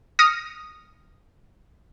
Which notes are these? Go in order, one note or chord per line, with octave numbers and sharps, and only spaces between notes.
D#6 F6 A#6 C#7